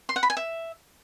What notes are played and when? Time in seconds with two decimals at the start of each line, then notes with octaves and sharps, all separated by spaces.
0.09 C6
0.16 F#5
0.23 B5
0.30 G#5
0.37 E5